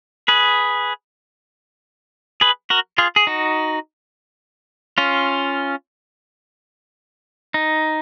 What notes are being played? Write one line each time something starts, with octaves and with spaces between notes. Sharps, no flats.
G#4 B4
G#4 B4
F#4 A#4
F4 G#4
G#4
D#4 F#4
C#4 F4
D#4